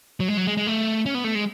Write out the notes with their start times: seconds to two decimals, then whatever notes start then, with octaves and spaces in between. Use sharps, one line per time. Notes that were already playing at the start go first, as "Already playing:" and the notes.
0.20 F#3
0.28 G#3
0.37 F#3
0.47 G#3
0.57 G#3
0.67 A3
1.06 C#4
1.15 B3
1.24 A3
1.35 G#3